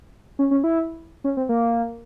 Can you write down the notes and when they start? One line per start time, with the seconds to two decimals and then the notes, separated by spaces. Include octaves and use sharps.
0.39 C#4
0.51 C#4
0.64 E4
1.24 C#4
1.37 C4
1.49 A#3